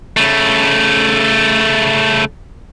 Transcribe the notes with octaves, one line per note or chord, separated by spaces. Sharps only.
C#3 A3